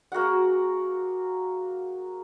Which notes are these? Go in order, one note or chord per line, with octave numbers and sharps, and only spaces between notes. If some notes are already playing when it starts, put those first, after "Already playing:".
A#3 F#4 G#4 F#5